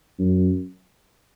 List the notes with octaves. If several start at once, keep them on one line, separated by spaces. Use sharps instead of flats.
F#2